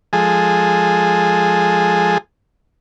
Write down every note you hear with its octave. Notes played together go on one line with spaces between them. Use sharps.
F3 G#3 G#4 A4